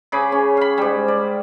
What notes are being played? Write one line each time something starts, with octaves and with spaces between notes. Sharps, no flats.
C#3 G#4 B5 D6
C#4
F5 B5
G#2 G3
D5